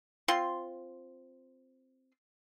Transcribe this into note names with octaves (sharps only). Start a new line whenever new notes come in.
C4 F4 C6